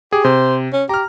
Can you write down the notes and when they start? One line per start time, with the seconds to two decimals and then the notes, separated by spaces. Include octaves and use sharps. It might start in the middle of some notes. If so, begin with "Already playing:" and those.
0.13 G4 G#4
0.25 C3 C5
0.73 C#4
0.89 G4 A#5 F6